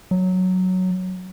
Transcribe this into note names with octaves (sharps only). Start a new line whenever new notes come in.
F#3